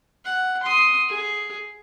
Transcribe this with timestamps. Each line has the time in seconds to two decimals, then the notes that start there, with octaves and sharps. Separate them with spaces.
0.25 F#5
0.63 C6 D#6
1.09 G#4